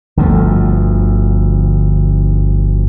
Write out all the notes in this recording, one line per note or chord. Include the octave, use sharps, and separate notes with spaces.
G1 D2 F3 A3